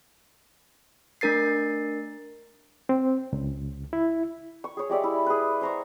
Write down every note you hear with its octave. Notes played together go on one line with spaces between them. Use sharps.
A3 D4 A#4 A6 C7
C4
C#2
E4
C#6
G#4 C#5
G#3 G4 D5 E5
E4
G#4 B4
C5 A#5 C#6